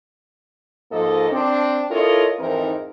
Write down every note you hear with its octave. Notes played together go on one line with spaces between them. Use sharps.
G#2 F3 A#3 A4 D#5
C4 D4
E4 F4 A4 A#4 C#5 D#5
F2 G#2 E3 C4 D#4 A#4